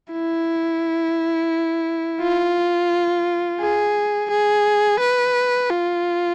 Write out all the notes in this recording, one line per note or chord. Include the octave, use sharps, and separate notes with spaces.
E4
F4
G#4
G#4
B4
F4